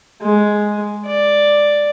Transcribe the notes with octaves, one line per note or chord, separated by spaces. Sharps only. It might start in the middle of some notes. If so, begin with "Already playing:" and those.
G#3
D5